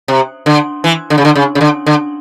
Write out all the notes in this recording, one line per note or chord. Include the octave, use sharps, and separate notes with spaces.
C3
D3
E3
D3
C#3
D3
C#3
C#3
D3
D3